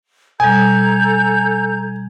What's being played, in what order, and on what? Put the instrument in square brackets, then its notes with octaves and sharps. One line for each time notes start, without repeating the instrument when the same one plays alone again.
[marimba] B2 G3 [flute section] A4 A#5 G6 [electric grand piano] G#5